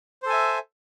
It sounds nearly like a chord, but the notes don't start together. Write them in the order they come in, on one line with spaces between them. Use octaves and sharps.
C5 A4 G#5 E5